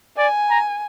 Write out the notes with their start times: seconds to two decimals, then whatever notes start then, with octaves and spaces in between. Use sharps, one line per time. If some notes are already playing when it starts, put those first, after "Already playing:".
0.18 D5 G#5
0.50 A#5